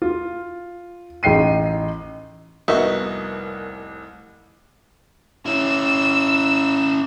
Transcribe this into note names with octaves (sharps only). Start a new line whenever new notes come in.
F4
A1 D#4 G5 C7 D#7
F1 C2 A#3 B3 D#4 F#4 E5
C#4 E4 E6